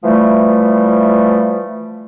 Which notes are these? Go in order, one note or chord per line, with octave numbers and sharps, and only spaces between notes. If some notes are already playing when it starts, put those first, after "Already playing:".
E3 F3 G3 A3